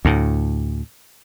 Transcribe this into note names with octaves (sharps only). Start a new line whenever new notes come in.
D2 A2